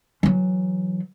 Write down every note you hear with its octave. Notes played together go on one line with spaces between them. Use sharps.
E3 F#3